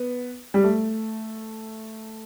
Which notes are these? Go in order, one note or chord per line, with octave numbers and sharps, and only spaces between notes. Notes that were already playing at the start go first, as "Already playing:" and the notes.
Already playing: B3
G3
A3